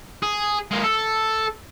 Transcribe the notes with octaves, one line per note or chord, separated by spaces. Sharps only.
G#4
G#3 A#3
A4